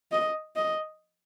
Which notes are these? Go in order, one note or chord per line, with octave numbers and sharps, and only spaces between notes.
D#5
D#5